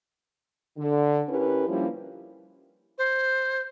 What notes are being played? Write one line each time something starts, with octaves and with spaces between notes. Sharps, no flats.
D3
C#4 E4 G4 A#4 B4
F3 G3 A#3 C#4 D4 E4
C5